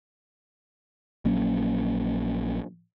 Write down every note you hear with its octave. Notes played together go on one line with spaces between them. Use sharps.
A#1 F#3 A#3 C#4